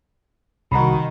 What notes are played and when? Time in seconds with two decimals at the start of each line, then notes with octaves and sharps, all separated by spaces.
0.72 C2 D#3 F#4 A#5 B5